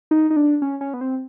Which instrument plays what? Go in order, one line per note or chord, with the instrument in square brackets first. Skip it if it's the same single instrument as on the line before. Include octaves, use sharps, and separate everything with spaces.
[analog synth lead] D#4
D#4
D4
C#4
C#4
B3
C4